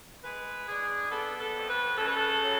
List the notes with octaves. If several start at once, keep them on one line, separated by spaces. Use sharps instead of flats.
G#3 B4
D4 G#4
B3 A4
A4
F2
B4
C#3 A4
B4
A4
F#3